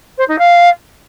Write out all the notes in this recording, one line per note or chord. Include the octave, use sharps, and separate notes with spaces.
C5
D#4
F5